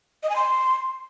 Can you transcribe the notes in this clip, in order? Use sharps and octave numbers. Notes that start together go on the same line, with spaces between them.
D#5
G#5
C6